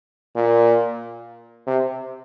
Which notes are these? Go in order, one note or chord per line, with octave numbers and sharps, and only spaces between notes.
A#2
C3